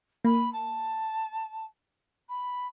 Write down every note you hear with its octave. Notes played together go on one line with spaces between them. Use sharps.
A#3 B5
A5
B5